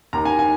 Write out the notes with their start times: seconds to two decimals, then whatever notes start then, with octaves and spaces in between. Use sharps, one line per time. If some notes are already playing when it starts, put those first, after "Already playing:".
0.13 D#2 D#3 A#5
0.25 G#5
0.39 G#5